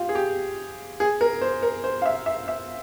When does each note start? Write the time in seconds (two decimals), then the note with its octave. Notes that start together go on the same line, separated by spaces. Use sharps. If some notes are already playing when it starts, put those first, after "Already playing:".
Already playing: F4 G4
0.09 G#4
0.15 G4
1.00 G#4
1.21 A#4
1.41 C5
1.63 A#4
1.84 C5
2.02 F5
2.06 E5
2.26 E5
2.48 E5